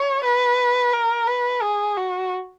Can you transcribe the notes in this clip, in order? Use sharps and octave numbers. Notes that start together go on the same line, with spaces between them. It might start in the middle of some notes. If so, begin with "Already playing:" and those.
Already playing: C#5
B4
A#4
B4
G#4
F#4